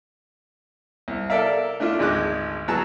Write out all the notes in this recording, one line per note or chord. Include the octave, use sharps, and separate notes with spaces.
C2
A4 A#4 D5 E5 F5
A3 D4 E4 F4
G#1 D2 G#3 D#5 D6 F#6
F#3 B3 G#4 A5 A#5 E6